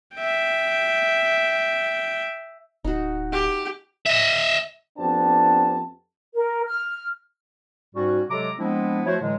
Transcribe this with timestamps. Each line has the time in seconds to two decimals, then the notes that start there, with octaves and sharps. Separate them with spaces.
0.16 E5 G5
2.85 D1 D#4 F#4
3.32 G4
4.06 D#5 E5
4.99 F2 B3 C4 D4 G4 A5
6.34 A#4
6.65 F6
7.95 G#2 G3 C#4 F#4
8.30 C3 F#3 G#3 A4 A#5 D6
8.59 F3 G#3 B3 C4 D4 E4
9.05 F3 A3 E4 F#4 C5 C#5
9.20 A2 D3 E3 F#3 G#3